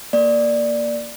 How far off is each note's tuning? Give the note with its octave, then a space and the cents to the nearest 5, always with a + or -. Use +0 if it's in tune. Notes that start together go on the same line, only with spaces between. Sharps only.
A#3 +0 D5 +5